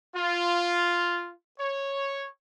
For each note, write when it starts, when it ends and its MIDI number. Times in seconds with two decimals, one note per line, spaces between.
0.15 1.31 65
1.59 2.28 73